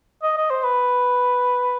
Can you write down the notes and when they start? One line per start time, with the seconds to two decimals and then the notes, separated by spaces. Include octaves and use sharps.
0.23 D#5
0.37 D#5
0.50 C5
0.63 B4